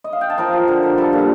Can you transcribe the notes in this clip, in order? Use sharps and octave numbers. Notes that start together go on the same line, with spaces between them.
D#5
F5
G5
A5
F3 A#4 A#5
F3
D3
D3
G3 A4 A5
A#2
A#5